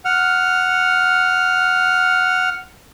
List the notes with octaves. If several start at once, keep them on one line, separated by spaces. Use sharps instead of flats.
F#5 F6